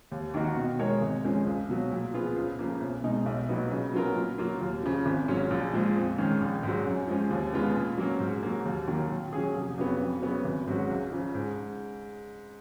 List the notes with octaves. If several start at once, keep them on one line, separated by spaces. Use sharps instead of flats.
D#2
D#3 A#3 D#4 F#4
B2
G#3 D#4 A#4 C#5
G#1
F#2 F3 G#3 C#4
C#2
B2 F#3
A#2
F3 B3 F4 G#4
C#2
C#3 F3 A#3
B1
B2 G#3 D#4
B1
A#2 F#3 B3 D#4
C#3
F#3 B3 F4 A#4
A#2
F#3 A#3 F4
D#2
C#3 F3
G#1
G#2 F#3 C#4 F4
A#1
A#2 F3 G#3
F2
D#3 G#3 C#4
A#1
G#2 F#3
F#2
F3 G#3 C#4
D#2
C#3 G#3 B3 F4
A#2
F#3 A#3 C#4
G#2
F#3 A#3
D#2
D#3 F#3 A#3
A#2
F#3 C#4 G#4
F1
F2 C#3 F#3 B3
F2
C#3 F#3 B3
G#1
G#2 F#3 C#4 F#4
C#2
C#3 F3
G#2